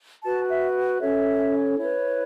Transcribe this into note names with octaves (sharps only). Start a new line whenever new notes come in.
F#4 B4 A5
E5
C#4 A4 C#5 E5
E4 B4 C#5